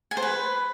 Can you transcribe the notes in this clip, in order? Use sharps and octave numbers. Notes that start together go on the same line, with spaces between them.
G#5
C5
B4